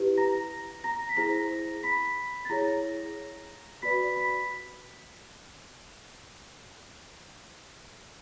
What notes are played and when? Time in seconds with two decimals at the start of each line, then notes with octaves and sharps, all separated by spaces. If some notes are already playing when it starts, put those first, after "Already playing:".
Already playing: E4 G4 B4
0.18 A#5 A#6
0.84 A#5 A#6
1.09 B6
1.17 E4 G#4 C5 A#5 A#6
1.83 B5 B6
2.45 A6
2.50 E4 G#4 C#5 A#5 A#6
3.82 F#4 B4 D5 B5 B6
4.16 B5 B6